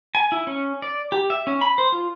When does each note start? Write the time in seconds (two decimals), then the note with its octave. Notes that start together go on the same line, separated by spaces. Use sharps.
0.15 G#5
0.32 E4
0.47 C#4
0.82 D5
1.12 G4
1.30 E5
1.47 C#4
1.61 B5
1.78 C5
1.92 F4